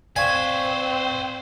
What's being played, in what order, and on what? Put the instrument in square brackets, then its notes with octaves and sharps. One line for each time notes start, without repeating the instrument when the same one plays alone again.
[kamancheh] C4 [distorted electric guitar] B4 C5 [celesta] D5 F5 C#6 [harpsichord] G#5